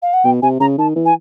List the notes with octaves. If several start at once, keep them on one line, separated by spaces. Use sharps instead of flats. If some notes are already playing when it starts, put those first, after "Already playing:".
F5
F#5
B2 G5
C3 G#5
C#3 A#5
D#3 A5
E3
G#5